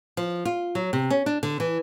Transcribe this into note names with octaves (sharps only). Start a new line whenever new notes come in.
F3
F4
F#3
C3
C#4
D4
D3
E3